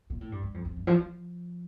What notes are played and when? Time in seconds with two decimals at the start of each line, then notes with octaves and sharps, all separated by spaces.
0.10 A#2
0.21 A2
0.32 G2
0.43 G2
0.54 F2
0.65 F2
0.76 G2
0.87 F3
0.99 F3